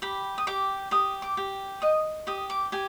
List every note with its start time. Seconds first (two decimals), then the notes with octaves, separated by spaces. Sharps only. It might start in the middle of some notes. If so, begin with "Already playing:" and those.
0.02 G4 B5
0.38 D#6
0.47 G4 D6
0.91 G4 D#6
1.22 D6
1.37 G4
1.82 D#5 D#6
2.27 G4 D#6
2.50 D6
2.72 G4 G#5